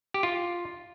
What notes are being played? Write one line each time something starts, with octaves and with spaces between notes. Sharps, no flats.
G4
F4